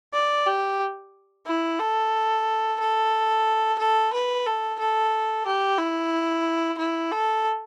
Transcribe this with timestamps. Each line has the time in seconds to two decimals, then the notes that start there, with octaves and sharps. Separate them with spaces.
0.13 D5
0.46 G4
1.46 E4
1.79 A4
2.80 A4
3.78 A4
4.13 B4
4.46 A4
4.79 A4
5.46 G4
5.78 E4
6.78 E4
7.12 A4